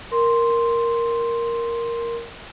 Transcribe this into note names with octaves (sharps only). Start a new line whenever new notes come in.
A#4 C6